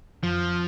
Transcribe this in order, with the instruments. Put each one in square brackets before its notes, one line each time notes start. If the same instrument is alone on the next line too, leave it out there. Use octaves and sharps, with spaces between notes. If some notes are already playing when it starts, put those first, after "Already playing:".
[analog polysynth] F2 [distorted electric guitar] F3
[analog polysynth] F2